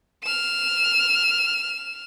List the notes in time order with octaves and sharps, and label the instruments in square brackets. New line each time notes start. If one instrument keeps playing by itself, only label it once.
[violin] F6 E7